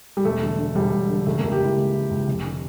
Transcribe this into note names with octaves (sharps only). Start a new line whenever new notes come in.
G3
E1 A3
D3
D3
E1 G3
E1
D3
C#2 A3
C#2 A#3
G4
C#2 E4
C#2
E3
C#2
F1
D3